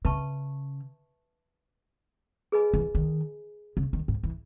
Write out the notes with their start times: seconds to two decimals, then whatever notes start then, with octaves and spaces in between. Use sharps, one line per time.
0.05 C#3 B4 E5 A5 C#6
2.52 G#4 B4 D#5 G#5 B5
2.74 E3
2.95 D#3
3.77 C#3
3.93 D#3
4.08 G#2
4.23 E3